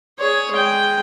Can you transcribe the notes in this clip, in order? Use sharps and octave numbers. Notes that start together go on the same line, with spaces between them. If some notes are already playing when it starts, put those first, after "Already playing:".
G#4 C#5
G#3 G5